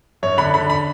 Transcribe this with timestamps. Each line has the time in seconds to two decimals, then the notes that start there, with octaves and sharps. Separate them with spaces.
0.23 F#2 C#5
0.38 D3 B5
0.54 D3 B5
0.70 B5